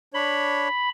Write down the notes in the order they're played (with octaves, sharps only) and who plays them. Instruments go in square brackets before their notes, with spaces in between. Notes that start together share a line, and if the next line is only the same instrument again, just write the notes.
[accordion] D4 C#5 [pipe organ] B5